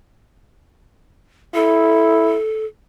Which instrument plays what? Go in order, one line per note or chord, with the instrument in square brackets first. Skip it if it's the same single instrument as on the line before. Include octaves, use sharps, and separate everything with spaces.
[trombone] E4 [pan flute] A4